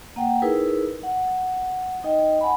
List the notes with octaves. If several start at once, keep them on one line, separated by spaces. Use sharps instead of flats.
A#3 F#5 G5
D#4 E4 G#4 A#4 B4
F#5
D#4 D#5 G5
F#5 G#5 B5